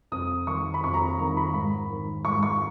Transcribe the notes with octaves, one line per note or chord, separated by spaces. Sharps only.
F2 D#6
D#3 C#6
B5
F2 C#6
A#5
B5
D#3 A#5
B5
G#2 B5
D#3
G#2 C#6
C#6